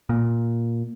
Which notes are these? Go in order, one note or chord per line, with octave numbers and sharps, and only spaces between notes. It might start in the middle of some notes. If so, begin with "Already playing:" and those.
A#2